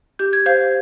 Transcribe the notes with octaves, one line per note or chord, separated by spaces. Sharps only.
G4 G6
G#6
C5 F5 G6